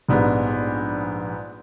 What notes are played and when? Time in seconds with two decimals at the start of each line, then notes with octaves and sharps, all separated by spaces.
0.09 A#1 G#2 G3 B3